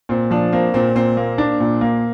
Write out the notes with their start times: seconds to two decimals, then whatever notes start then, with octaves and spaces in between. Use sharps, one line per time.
0.09 A#2 C4
0.31 F3 D4
0.52 A#3 C4
0.74 A#2 C4
0.95 A#2 C4
1.17 A#3
1.38 D4
1.60 A#2
1.81 A#3